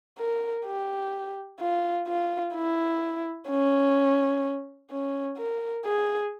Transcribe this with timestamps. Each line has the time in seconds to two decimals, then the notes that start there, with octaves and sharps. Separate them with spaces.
0.19 A#4
0.66 G4
1.60 F4
2.08 F4
2.55 E4
3.49 C#4
4.91 C#4
5.38 A#4
5.85 G#4